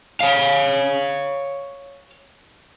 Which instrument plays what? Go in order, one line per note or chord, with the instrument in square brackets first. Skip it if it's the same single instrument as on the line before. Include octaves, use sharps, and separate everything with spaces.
[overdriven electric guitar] C#5 F5